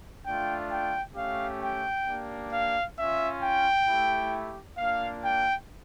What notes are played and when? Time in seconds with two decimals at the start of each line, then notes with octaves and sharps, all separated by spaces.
0.25 A3 D4 F4 G5
0.70 G5
1.16 A3 C#4 G4 F5
1.62 G5
2.07 A#3 D4 G4
2.52 F5
2.97 C#4 F4 E5
3.42 G5
3.88 A3 E4 G4
4.78 A#3 D4 F4 F5
5.24 G5